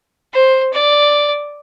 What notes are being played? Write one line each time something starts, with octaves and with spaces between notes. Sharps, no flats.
C5
D5